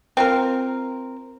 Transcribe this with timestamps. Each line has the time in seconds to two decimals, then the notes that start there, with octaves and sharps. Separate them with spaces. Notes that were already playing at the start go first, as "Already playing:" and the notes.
0.17 C4 F4 A#4